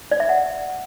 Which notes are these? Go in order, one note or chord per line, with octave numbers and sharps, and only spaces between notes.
D5
E5
F#5